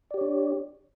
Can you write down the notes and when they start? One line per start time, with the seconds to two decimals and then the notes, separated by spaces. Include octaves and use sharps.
0.11 D5
0.14 G4
0.18 C#5
0.21 D4